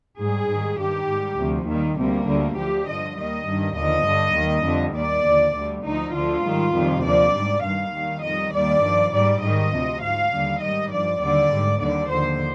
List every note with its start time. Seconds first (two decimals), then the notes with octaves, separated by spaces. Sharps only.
0.21 G#2 G3 G#4
0.51 G#2 D#3 G3
0.80 G2 D#3 G3 G4
1.10 G#2 G3
1.40 D2 C3 F3
1.70 D#2 D#3 G3
1.99 D2 C3 G3 A#3
2.29 D2 D3 G3
2.59 D2 D3 F3 G4
2.88 G2 D3 F3 D#5
3.18 D#2 D#3 G3 D#5
3.48 G2 D#3 G3
3.78 D#2 D3 F3 D#5
4.07 G2 D3 G3
4.38 D#2 D#3 G3
4.67 F2 D3 G3
4.97 D#2 D#3 G3 D5
5.26 D#2 D3 F3
5.56 D2 D3 G3
5.86 D2 D3 F3 D#4
6.16 D2 D3 F3 F4
6.45 G#2 D#3 G3
6.75 F2 C3 D#3 G3
7.05 D#2 D3 F3 D5
7.35 G#2 G3
7.65 G2 D#3 G3 F5
7.94 D#2 D#3 G3
8.24 F2 D#3 G3 D#5
8.54 D#2 D#3 G3 D5
8.84 G2 F3
9.13 G#2 G3 D5
9.43 G#2 D#3 G3 D#5
9.73 D2 C3 F3
10.02 G#2 F3 F5
10.32 D#2 D3 G3
10.62 G#2 D#3 G3 D#5
10.91 G2 F3 D5
11.21 D#2 D3 G3 D5
11.51 G#2 G3
11.81 D#2 D3 G3 D5
12.10 D#2 D3 F3 C5